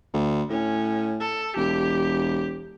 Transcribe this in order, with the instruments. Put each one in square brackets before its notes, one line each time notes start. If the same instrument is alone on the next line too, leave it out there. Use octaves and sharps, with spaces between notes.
[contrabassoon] D2
[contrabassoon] A2 [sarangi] C#4
[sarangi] A4
[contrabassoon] E1 [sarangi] G4